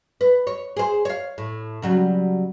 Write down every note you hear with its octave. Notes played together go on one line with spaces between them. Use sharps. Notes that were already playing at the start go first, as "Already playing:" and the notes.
B4
C#5
G#4 C5
C#5 F5
A2
C#3 F#3 G3